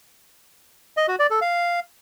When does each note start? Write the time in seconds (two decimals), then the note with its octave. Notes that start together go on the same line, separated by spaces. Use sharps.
0.97 D#5
1.08 F#4
1.19 D5
1.30 A4
1.42 F5